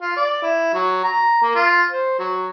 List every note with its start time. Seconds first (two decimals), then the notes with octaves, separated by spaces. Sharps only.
0.01 F4
0.17 D5
0.43 E4
0.74 F#3
1.04 A#5
1.43 A#3
1.55 F4
1.91 C5
2.19 F#3